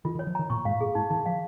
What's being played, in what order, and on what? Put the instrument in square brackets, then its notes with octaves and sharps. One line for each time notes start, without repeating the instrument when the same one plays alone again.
[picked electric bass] D#3 [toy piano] F4
[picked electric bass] D#3
[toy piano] C#5
[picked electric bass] F3
[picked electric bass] D#3 [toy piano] A#5
[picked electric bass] A#2 [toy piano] C#6
[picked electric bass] G#2 [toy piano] F5
[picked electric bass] A#2 [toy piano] G#4
[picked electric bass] G#2 [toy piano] D#4
[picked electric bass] D#3 [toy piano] D#4
[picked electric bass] F3 [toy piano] F5